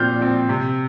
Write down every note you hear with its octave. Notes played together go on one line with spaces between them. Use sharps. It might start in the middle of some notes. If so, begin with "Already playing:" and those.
Already playing: A#2 F3 C4 F6 G6
F3 C4
C3